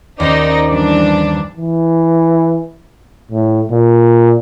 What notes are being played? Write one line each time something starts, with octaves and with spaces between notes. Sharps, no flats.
D#2 C#4 D#4 C5 D5
G2 E3 D4 D5
E3
A2
A#2